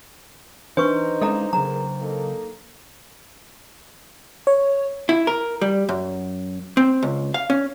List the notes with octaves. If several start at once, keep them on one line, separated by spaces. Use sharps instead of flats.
E3 D4 D#4 B4 C5 C#6
G#3 C#4 A4 D#5 A#5
C#3 F#3 G#4 A#4 A#5
A#3 D#4 A4
C#5
E4
A#4
G3
F#2
C4
C#2
F5
C#4